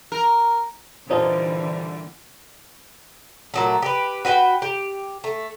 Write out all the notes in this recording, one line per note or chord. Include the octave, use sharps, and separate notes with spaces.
A#4
A#2 D3 E3 G3 D#4 F4 C5 A5
A#2 F#3 A3
G4 B4
F#4 B4 D5 G5
G4
A3